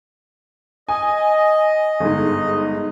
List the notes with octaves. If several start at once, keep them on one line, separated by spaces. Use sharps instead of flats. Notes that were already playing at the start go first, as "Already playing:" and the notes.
D#5 G#5
G1 G#2